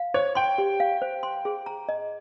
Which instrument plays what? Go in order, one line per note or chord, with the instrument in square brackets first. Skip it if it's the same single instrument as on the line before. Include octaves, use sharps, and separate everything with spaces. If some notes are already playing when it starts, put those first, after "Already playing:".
Already playing: [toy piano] F5
[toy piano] C5 [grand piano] C#5
[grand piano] G5 [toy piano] C6
[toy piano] G4
F5
C5
C6
G#4
A#5
D#5